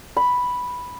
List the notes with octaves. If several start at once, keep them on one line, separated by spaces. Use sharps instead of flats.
B5